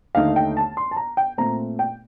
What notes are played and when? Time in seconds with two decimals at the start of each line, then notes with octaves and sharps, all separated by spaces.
0.15 D#2 D3 A3 D#4 F5
0.36 G5
0.57 A5
0.77 C6
0.91 A5
0.97 A#5
1.17 G5
1.38 A#2 A3 C4 A#5
1.79 G5